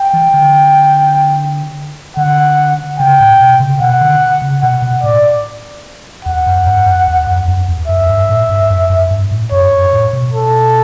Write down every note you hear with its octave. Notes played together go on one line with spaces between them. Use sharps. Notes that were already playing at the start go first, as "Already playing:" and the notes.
Already playing: G5
E3
D3
D3 F#5
C#3 G5
A2
B2
C#3
B2 F#5
D3
C#3
B2 F#5
B2
A2 D5
E2 F#5
F#2
G2
F#2
E2
F#2
F#2
E2
F#2 E5
G2
A2
G2
F#2
F#2
G2
A2
F#2 C#5
G2
F#2
A2
B2
A4